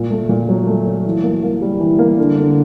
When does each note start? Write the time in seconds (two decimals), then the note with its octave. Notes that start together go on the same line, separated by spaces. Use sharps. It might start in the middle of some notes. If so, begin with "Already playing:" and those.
Already playing: A#2
0.10 A3
0.29 A#2
0.49 F#3
0.67 A3
0.85 F#3
1.05 E3
1.23 A#3
1.43 A#3
1.62 G3
1.80 E3
1.99 A#3
2.17 D3
2.37 D3